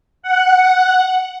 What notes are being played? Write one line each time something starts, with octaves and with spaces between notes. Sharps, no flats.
F#5